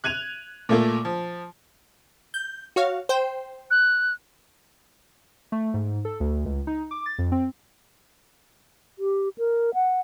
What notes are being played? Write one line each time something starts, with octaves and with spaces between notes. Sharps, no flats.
F#6 G#6 D#7 F7
A#2 A3 A#3
F3
G6
F#4 C#5 F5
C5 G5
F#6
A3
G#2
A4
D2
C#2
D#4
D6
A6
F2
C4
G4
A#4
F#5